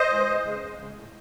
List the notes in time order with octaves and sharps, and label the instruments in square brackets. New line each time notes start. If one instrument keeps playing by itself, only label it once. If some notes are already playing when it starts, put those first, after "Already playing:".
Already playing: [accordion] C5 D#5
E3 G#3
E2
C#3 G#3
E2
C#3 G#3
A2